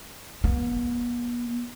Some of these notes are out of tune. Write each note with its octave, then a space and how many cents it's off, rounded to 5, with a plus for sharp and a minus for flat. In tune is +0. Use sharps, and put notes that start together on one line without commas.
B3 -40